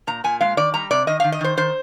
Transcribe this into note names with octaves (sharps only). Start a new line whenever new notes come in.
A#2 A#5
A#2 G#5
G#3 F5
D#3 D5
G3 A#5
C3 D5
D#3 D#5
F5
D#3
D#5
D#3 C5
D#3 C5